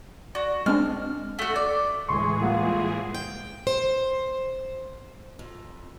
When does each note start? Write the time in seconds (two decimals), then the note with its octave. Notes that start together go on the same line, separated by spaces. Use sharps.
0.35 F#4 D5
0.66 G#3 C4 D4 F6
1.39 A3 F#4
1.56 D5
2.09 D2 A2 E3 G#3 G#4 C6 C#6
2.41 G3 A#3 F4 F#5
3.15 G5
3.67 C5
5.39 F2